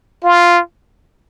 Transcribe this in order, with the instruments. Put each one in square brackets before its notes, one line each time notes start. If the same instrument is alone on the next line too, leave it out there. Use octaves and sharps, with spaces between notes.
[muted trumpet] F4